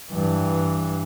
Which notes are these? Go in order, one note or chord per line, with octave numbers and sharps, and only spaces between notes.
G2 E3